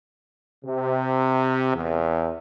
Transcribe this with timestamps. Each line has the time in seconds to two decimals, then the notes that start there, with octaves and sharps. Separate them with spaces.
0.65 C3
1.74 E2